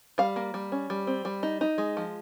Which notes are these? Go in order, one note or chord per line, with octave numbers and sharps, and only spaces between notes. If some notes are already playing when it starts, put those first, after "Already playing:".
G3 F5
A#3
G3
C#4
G3
C4
G3
D#4
D#4
G#3
F3